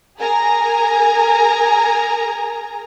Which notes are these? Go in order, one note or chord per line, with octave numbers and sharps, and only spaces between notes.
G#4 A#4 G#5 A#5